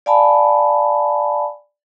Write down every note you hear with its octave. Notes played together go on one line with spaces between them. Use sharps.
D5 F5 G#5 A5 B5